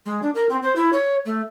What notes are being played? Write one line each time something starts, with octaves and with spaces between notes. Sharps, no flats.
G#3
D4
A#4
C4
C5
E4
C#5
A3